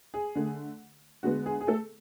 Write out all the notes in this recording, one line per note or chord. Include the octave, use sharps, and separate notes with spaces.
G#4
D3 A3
D3 G#3 B3 F#4
G#4
G#4
A3 A4